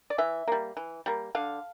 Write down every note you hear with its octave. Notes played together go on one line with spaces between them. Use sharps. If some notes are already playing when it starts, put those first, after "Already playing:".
D5
E3 E5
G3 A#3
E3
G3 A#3
D3 F5